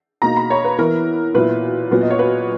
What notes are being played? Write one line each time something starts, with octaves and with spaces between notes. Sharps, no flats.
B2 A#3 D#4 A#5
B5
C#5
B4
E3 B3 E4 A#4
A#2 F#3 B3 E4 B4
A#2 F#3 B3
D#5
C#5
B4